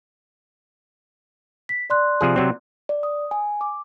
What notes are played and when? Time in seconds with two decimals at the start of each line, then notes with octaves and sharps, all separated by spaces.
1.69 B6
1.90 D5 C6 F#6
2.21 C3 F3 G#4
2.36 C3 F#3 C4
2.89 D5
3.03 D#6
3.31 G#5
3.61 D6